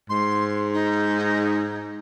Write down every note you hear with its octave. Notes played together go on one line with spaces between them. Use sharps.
G#2 C6
D#4